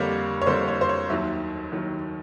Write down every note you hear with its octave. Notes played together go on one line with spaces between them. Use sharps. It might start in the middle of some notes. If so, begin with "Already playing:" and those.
Already playing: F2 D3 G3 A#3 C#5
C#5
F2 D3 G3 A#3 C5
C#5
C5
C#5
D#2 D#3 F#3 E5
D#2 D#3 F#3